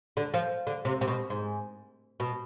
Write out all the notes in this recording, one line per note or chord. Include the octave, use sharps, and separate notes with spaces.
D3
F3
D3
C3
C3
B2
G#2
B2